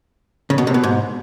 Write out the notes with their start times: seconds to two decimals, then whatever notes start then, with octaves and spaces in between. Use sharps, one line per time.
0.50 C#3
0.58 B2
0.67 C3
0.74 B2
0.83 G#2